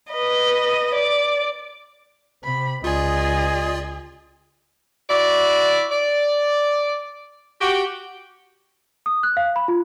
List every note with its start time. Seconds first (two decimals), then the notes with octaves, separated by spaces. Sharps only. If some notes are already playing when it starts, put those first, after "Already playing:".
0.11 B4 D#5
0.94 D5
2.43 C3 B5
2.84 C#2 F4 G#4 D5 D#5
5.10 E4 F#4 D5
5.92 D5
7.61 F#4 G4
9.06 D#6
9.23 F#6
9.37 F5
9.56 B5
9.68 F4